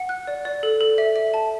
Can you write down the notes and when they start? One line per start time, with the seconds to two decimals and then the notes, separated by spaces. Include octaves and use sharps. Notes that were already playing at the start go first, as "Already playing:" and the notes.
Already playing: F#5
0.09 F#6
0.27 D5
0.45 D5
0.63 A4
0.81 A4
0.98 E5
1.16 E5
1.34 A5